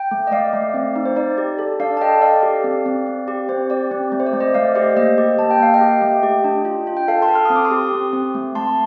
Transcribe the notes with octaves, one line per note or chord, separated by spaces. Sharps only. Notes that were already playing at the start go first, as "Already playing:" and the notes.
Already playing: G5
A3
D#5
A3 D5 F5
A3
C4
D#4
C5
D#4 D5
G4
A4
D4 D5 F5
A5
A4 D#5 G5
A4 D5 F5
G4
C4
C4
C4
G4
C4 C5
G4 D5
C4
A3
C5
D5
A3
C5 D#5
A3 D5 F5
G4 C5 D#5
A#3 C5 D#5
G4
A#3 A5
G5
A#3 F5
D#5 G5
G4
A3
G4
D4
F4
F4
G5
A4 F5 A5
A5 C6
A4
F6
C4 D#6
D6
C6 D#6
G4
C4
C4
A3
A3 A5 C6